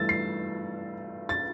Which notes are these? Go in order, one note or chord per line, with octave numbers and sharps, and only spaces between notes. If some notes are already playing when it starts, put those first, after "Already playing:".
Already playing: G2 E3 A3 E6 A6
C7
A6